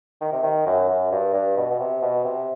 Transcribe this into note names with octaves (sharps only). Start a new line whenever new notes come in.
D#3
C3
D#3
F#2
F#2
G2
G2
B2
B2
C3
B2
C3